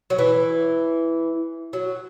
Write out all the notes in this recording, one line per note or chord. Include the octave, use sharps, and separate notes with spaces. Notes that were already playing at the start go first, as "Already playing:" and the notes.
F#3
E3
F#3